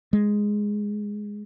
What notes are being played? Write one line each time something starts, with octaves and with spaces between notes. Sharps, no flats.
G#3